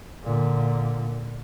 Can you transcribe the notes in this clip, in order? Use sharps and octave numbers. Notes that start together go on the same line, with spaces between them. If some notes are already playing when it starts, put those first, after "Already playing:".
A#2 D3